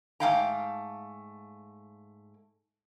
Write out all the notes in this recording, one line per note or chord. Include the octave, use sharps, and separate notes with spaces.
G#2 A3 F5 G5 A#5